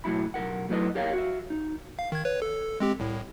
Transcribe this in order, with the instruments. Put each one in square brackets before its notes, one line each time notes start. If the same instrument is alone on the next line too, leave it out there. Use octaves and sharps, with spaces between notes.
[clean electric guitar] B1 A2 D#3 F#3 E4 B5
B1 F#2 A#4 F#5
F#3 A3 E4 B4 D#5
G4 A#4 C#5 F5
F#4 E5
D#4
[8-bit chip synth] F5
D#3 G#6
B4 C#5
A4
G#3 C4 G4
C2 A2